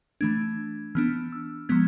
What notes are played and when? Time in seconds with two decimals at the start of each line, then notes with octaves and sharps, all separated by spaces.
0.21 E3 A3 D4 G#6
0.95 E3 B3 D4 F6
1.32 E6
1.69 F3 G#3 B3 G#6